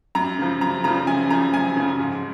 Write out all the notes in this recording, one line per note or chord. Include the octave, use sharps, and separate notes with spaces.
F#2 A#5
C#3 F3
F#2 A#5
C#3 F3 A#5
F#2 G#5
C#3 F3 A#5
F#2 G#5
C#3 F3
G#2